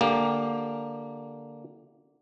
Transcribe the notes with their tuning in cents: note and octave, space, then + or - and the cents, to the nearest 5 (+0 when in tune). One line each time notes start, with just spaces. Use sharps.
D3 +0 A#3 +0 G4 +25